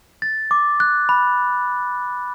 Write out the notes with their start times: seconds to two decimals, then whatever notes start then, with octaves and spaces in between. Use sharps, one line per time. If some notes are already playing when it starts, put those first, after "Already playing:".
0.22 A6
0.51 D6
0.80 F#6
1.09 B5